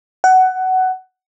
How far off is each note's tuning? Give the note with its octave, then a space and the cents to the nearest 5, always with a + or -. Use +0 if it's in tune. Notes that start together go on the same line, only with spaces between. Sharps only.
F#5 +15